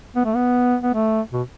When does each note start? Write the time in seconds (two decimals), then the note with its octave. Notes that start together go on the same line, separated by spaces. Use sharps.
0.16 B3
0.25 A3
0.35 B3
0.83 B3
0.94 A3
1.33 B2